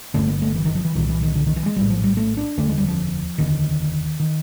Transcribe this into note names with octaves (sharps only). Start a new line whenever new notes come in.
G1 G2 D3 A3
A#3
A3
E3
D#3
F3
E3
C2 A#2 D#3
E3
D#3
D3
D#3
E3
G#3
A#1 A2 G3
F3
G3
A3
D4
F1 D#2 D3 A3
G#3
G3
F3
F1 D#2 D3 D#3
D#3